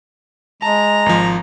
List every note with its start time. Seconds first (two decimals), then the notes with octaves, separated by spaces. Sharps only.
0.62 G#3 A5 A#5
1.06 G#1 F3